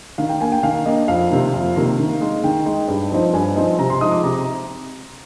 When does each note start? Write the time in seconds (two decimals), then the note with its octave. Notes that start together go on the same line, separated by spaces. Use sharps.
0.18 D#3 F5
0.29 G5
0.41 A#3 D4 G#5
0.52 G5
0.63 D#3 F5
0.86 A#3 D4 D#5
1.08 F2 F5
1.31 C3 D#3 A#3
1.54 F2
1.76 C3 D#3 A#3
1.98 D#3
2.21 G#3 D#4
2.44 D#3 G5
2.66 G#3 D#4
2.88 G2
3.11 F3 C4 D#4
3.33 G2 G#5
3.56 F3 C4 D#4
3.79 C3 A#5
3.90 C6
4.01 F3 G#3 D#4 D#6
4.12 D6
4.24 C3 A#5